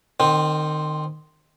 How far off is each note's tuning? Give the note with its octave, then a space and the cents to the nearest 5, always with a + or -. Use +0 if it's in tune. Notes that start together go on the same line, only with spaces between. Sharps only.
D#3 -25 C4 +0